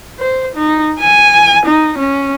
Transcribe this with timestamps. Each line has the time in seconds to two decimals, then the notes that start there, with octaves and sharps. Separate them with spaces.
0.19 C5
0.56 D#4
1.00 G#5
1.66 D#4
1.98 C#4